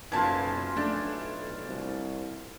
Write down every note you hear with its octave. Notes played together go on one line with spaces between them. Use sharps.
F#1 B1 E4 F4 G#5 A5
B1 A3 D4
C2